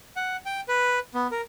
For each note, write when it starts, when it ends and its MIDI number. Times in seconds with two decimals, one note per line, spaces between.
0.16 0.36 78
0.46 0.61 79
0.68 0.99 71
1.14 1.27 59
1.31 1.41 70